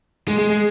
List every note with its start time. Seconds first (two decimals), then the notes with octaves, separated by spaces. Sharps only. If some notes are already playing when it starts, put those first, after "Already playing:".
0.28 G#3
0.39 G#3
0.50 G#3